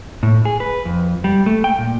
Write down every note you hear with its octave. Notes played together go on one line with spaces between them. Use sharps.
A2
G#4
B4
F2
G3
A3
G5
A#2